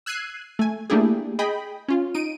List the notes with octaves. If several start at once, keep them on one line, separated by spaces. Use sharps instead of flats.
E6 F#6 G#6 C7 D#7
A3 G#5
A3 A#3 D4 E4 G4 G#4
G#4 D#5 G5 B5
C#4 F4
D#4 D7 D#7